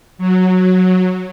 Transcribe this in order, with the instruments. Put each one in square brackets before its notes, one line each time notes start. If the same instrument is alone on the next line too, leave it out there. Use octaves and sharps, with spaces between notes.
[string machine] F#3